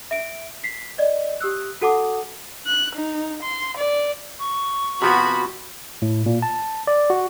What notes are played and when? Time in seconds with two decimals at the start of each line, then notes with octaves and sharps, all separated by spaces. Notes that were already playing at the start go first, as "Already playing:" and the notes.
0.11 E5 D7
0.64 B6 C7
0.98 D5 D#5
1.40 G4 D#6 E6 F#6
1.81 F#4 A4 F#5 A5 D6 D#6
2.67 F#6
2.95 D#4
3.43 C6
3.77 D5
4.40 C#6
5.02 C3 F3 B3 F#4 B5
6.02 A2
6.26 A#2
6.42 A5
6.87 D5
7.10 F#4